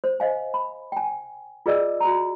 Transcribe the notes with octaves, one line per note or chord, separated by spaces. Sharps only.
C5
C5 D#5 F5 G#5
B5
G5 G#5
F4 G#4 B4 D5 D#5 E6
F#4 A#5